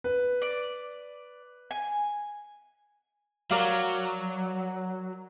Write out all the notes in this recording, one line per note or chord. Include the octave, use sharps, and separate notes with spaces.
B4
D5
G#5
F#3 A#4 D5 F5